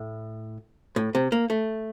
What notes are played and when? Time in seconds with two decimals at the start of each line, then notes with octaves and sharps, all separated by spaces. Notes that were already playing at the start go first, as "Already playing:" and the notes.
Already playing: A2
0.96 A2
1.15 C3
1.32 A#3
1.50 A3